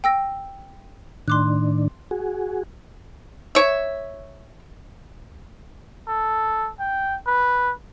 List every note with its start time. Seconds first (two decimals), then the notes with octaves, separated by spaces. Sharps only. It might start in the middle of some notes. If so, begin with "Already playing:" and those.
0.04 G5 E6 A#6
1.28 A2 D#3 D4 C6 D6 F#6
2.11 F#4 G#4
3.55 C#5 E5
6.08 A4
6.79 G5
7.27 B4